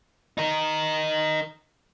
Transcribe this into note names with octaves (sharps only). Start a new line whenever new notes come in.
D#4 A#4